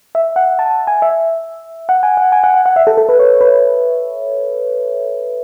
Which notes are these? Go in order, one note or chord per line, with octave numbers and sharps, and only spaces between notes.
E5
F#5
A5
G#5
E5
F#5
G#5
F#5
G#5
F#5
F#5
F#5
E5
A4
A4
B4
C#5
B4